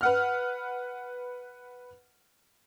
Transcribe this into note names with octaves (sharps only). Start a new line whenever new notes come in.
B4 F#5 F6